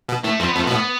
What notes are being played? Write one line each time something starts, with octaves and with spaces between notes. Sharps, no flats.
B2
A2 A3
F2 C4
B3
F2 A3
B2 B3
A2